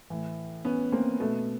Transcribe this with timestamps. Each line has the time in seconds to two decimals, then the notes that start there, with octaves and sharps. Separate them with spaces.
0.10 A2 E3
0.65 B3 C#4
0.92 A#3 C4
1.20 B2 A3 B3